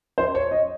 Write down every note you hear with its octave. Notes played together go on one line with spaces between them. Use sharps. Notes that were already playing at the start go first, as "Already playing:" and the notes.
C5
C#5
D#5